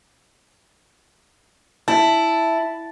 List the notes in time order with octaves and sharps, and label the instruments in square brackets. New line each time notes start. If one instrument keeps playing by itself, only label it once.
[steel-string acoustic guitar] E4 [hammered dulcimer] A5